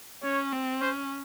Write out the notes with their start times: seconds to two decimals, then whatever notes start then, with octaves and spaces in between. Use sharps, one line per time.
0.23 C#4 C#5
0.52 C4
0.81 C#4 C5